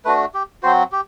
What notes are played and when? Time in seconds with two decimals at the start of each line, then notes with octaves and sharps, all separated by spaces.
0.05 A3 D4 F#4 B4
0.34 G4
0.63 F#3 C4 F#4 C5
0.92 G4